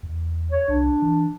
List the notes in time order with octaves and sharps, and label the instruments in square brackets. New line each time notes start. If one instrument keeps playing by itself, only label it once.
[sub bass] E2
[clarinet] C#5
[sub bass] C2 [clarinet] D4
[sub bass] E3